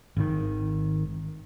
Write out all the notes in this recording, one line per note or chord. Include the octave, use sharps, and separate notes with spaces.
G#1 D#3